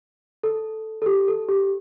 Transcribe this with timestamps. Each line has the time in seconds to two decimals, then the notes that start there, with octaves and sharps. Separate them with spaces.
0.43 A4
1.02 A4
1.06 G4
1.28 A4
1.49 G4